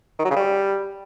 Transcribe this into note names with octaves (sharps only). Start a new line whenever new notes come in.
D#3
F#3
C#3
G3